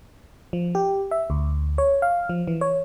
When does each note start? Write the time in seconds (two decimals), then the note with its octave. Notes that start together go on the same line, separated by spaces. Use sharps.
0.53 F3
0.75 G4
1.11 E5
1.30 D2
1.78 C#5
2.02 F5
2.29 F3
2.48 E3
2.61 C#5